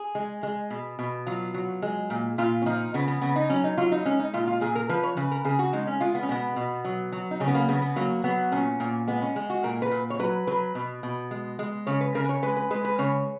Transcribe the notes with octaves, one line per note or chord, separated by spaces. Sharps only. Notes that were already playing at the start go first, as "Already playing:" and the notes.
Already playing: G#4
G#3
G#3
B2
B2
F#3 F4
F#3
G#3
A#2
A#2 F4
C#4
F3 D#4
C#3 B3
B3
C#3 B3
D#4
F#3 C#4
D#4
F#3 F4
D#4
G#3 C#4
D#4
A#2 F4
F4
A#2 G#4
A#4
F3 B4
C#5
C#3 B4
A#4
C#3 G#4
F#4
G#3 D#4
C#4
G#3 F4
B3
C#4
B2 B3
B2
F#3
F#3
D#4
C#3 C#4
B3
A#3
C#3 B3
B3
F#3 A#3
F#3 B3
A#2 C#4
A#2
G#3 B3
C#4
G#3
F#4
A#2 A#4
B4
A#2
C#5
F#3 B4
F#3 B4
B2
B2
G#3
G#3
C#3 C#5
B4
C#3 A#4
B4
C#5
G#3 B4
B4
G#3 B4
B4
C#3 C#5